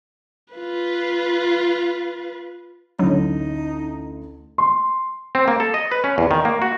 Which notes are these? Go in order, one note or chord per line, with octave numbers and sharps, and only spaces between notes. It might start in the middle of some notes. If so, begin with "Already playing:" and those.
F4 B4
A1 D2 F#3 D#4
C6
C4
A#3
A4
D#5
B4
C#4
E2
D#3
A#3
F#4